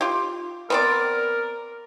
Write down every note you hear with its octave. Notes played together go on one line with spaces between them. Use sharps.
F4 G4
B3 C4 A#4 D5